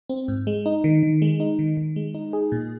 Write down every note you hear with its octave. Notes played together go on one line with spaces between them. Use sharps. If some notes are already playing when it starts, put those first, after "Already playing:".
C4
G#2
G#3
D#4
D#3
D#3
G#3
D#4
D#3
D#3
G#3
D#4
G#4
A#2